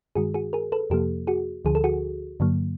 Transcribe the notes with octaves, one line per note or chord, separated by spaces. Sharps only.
G2 D#3 G#3 F#4 G#4
F#4 G#4
G#4 A#4
A4 B4
F2 C3 F3 A#3 G4 A4
F#4 G#4
D2 D3 F3 G#4
A4
F#4 G#4
G2 D3 F#3 A#3